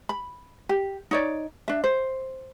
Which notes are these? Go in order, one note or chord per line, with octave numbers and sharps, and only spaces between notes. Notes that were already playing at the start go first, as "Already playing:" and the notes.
B5
G4
D#4 C#5 D5
D4 E5
C5